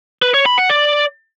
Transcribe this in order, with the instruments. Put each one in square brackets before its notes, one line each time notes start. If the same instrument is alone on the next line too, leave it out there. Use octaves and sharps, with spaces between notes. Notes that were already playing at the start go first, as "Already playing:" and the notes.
[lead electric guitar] B4
C#5
B5
F#5
D5